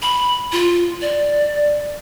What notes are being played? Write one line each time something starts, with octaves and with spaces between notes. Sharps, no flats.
B5
F4
D5